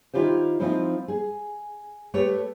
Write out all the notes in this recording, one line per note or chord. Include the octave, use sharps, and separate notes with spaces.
D#3 E4 F4 G4 C5
F3 C4 D#4 E4 C5
G#4
A3 G4 B4 C#5